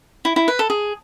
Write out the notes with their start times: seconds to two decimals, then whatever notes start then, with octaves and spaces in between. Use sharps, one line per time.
0.25 E4
0.36 E4
0.48 B4
0.59 A4
0.70 G#4